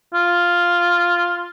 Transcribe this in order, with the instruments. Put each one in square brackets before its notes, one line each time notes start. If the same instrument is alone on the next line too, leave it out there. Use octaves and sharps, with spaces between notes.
[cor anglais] F4